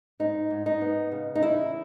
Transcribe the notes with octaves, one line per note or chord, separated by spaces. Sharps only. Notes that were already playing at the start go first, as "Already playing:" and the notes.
G#2 D#4
G#2
D#4
B3
C#3
D#4
E2 E4